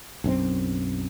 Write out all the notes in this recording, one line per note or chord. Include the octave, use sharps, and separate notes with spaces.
B1 F#2 F3 C4